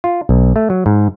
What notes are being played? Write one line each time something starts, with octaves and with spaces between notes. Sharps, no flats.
F4
B1
A3
F#3
G#2